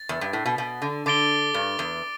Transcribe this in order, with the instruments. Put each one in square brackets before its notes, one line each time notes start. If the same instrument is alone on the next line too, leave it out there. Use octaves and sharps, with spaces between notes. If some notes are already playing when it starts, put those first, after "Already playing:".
Already playing: [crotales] A6
[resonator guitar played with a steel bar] E2
G2
A2
B2
B2
D3
[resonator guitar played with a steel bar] D3 [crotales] D6 A6 D7 G7
[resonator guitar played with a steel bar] G2
E2